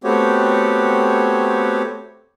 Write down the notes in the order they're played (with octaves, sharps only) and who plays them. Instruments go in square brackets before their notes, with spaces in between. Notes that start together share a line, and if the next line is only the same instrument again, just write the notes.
[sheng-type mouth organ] A3 B3 C4 F#4 G4 C#5